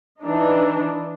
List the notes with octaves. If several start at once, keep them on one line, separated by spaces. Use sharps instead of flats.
E3 D4 D#4